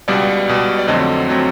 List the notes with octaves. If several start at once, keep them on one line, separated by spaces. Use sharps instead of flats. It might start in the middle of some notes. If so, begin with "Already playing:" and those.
C#2 B2 G3 D5
C#2 B2 G3
D5
F2 D3 F#3 A3 C4 D#5
D3 F#3 A3 C4